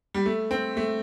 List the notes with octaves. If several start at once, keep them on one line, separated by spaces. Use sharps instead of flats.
G3
A3
C4
A3